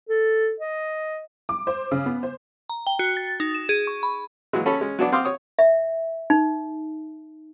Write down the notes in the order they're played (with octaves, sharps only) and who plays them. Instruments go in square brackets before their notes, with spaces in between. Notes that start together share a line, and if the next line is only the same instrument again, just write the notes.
[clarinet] A4
D#5
[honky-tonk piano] D6
C5
C#3
B3
C5
[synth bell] A#5
G5
F#4
A6
D#4
E7
G#4
C#6
B5
[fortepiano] A#2 E3 F#3 G#3
C#4 A4 C#5 B5
G#3 C#4
F#3 B3 D4 D5
C4 F5 C6 D6 D#6 F6
C#5 D#6
[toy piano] E5
D#4